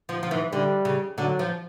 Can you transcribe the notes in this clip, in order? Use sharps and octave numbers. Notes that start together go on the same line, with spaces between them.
F3
F3
E3
D3 G3
C#3
D3 F#3
F3